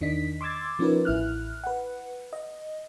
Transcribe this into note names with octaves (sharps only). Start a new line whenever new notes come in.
E2 D#3 D4 D#5 B6
C6 D6 E6 G#6 A6
F3 B3 C#4 D#4 A#4 B4
A1 E4 F6 F#6
B4 F#5
D#5